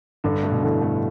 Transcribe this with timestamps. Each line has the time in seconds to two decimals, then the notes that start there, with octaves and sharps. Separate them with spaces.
0.24 G2 D3
0.43 A3
0.52 B2
0.63 A2 D3
0.81 A3